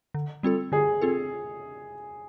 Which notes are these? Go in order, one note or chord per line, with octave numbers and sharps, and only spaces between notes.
D3
G3 C4 F4 A4
D3 G#4
C4 F4 A4